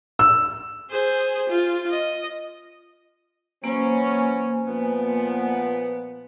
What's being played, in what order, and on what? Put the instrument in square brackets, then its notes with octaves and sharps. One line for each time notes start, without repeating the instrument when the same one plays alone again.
[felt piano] E6
[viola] G#4 C5
F4
D#5
[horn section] E3 F#3 C#4 [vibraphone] A#3 C5 G#5
[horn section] A#2 F3 B3